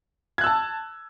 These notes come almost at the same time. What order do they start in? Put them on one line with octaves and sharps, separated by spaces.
G#6 F#6 E6 A5